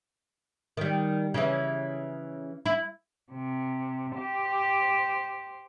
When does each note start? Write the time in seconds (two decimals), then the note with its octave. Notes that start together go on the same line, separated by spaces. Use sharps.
0.77 D#3 G3
1.34 C#3 E3
2.66 E4
3.32 C3
4.16 G4 C5